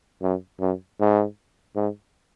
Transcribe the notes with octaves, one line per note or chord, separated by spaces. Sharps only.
F#2
F#2
G#2
G#2